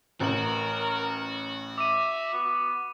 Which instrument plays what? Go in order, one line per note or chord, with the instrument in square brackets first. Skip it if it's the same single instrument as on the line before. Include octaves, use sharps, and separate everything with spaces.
[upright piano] A1 F#7 [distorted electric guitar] F#4 [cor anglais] A#4
[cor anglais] E5 [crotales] D6 D#7
[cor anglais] B3